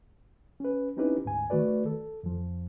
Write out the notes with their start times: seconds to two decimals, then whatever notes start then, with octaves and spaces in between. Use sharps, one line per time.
0.60 C#4 B4
0.97 C4 C#4 D#4 E4 G4 B4
1.25 D2 G#2 G#5
1.50 D#3 A3 F#4 B4 D5
1.86 A4
2.23 F2 F3